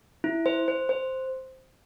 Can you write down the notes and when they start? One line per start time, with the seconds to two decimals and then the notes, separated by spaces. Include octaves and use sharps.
0.24 E4
0.46 C5
0.68 C5
0.89 C5